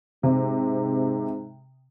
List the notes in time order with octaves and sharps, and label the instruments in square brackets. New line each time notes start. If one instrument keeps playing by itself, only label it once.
[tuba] G#2 [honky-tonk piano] C3